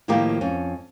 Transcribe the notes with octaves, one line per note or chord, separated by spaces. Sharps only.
A2 D#3 F3 A#3 D#4 G4
F2 C#4